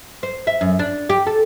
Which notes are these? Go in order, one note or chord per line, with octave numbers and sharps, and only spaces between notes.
C5
E5
F#2
D4
G4
A4